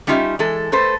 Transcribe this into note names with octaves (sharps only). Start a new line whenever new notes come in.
G3 C#4 D#4 F4 G4 E5
E3 G#3 A4
A3 A4 B4 C5